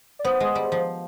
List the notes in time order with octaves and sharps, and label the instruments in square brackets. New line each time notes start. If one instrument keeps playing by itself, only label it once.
[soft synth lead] D5
[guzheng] B3 [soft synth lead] C5
[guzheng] G#3
G3
F3